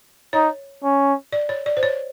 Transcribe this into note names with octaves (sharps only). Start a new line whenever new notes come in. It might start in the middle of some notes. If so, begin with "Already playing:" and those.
D#4 C#5
C#4
D5
C#5
D5
C5
C#5